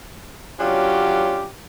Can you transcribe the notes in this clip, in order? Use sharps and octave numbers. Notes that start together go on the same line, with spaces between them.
F#3 C#4 D4 F4 G4